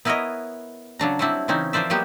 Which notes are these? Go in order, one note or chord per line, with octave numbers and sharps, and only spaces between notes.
B3 E4 A#4 B4 C#5 D#5
C#3 F#3 D4 A#5
F#3 G3 C4 D4 E4
C#3 E3 C4 C#4 D#4
F3 A#4 C5 D5 E5
F#3 G#3 A#3 B3 G4